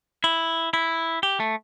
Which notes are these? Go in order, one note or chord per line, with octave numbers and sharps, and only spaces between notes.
E4
E4
G4
A3